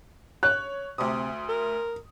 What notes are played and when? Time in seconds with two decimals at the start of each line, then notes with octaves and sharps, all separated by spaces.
0.43 C#5 F#6
0.98 D2 C3 D#6
1.48 A#4